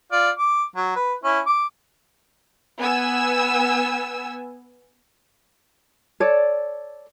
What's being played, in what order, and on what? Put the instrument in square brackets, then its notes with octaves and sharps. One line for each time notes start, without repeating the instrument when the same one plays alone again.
[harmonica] F4 D5
D6
F#3
B4
C#4 E4
D6
[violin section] B3 G#5 E6
[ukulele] A4 C#5 D5